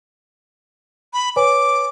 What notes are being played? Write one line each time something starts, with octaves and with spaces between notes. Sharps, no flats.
B5
B4 C#5 G#5 D6